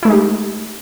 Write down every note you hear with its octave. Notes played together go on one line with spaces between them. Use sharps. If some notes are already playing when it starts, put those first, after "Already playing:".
G#3 A3 D#4 E4 G4